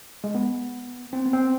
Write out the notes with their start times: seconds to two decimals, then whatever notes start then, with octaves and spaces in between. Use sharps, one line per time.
0.24 G#3
0.35 B3
1.13 C4
1.26 B3
1.33 C4